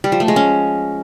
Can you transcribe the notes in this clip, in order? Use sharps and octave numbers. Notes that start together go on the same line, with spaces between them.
G3
F3
A3
G#3
C#4